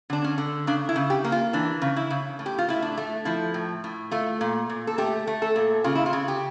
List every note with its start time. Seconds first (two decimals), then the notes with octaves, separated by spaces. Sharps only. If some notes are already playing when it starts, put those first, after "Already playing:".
0.10 D3 D4
0.24 C#4
0.38 D3
0.67 C#3 D4
0.89 E4
0.96 C#3
1.10 G4
1.24 A#3
1.32 F4
1.53 E3 D4
1.82 C#3
1.96 E4
2.10 C#3
2.39 A2
2.46 G4
2.58 F4
2.68 A2 E4
2.82 D4
2.97 A3
3.25 F3 E4
3.54 A2
3.84 A2
4.11 A3 F4
4.41 A#2
4.70 A#2
4.87 A4
4.98 A3 G4
5.27 A3
5.42 A4
5.56 A#2
5.84 C#3 F4
5.95 E4
6.06 F4
6.13 C#3
6.28 G4